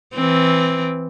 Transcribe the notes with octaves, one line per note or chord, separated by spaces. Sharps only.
E3 C4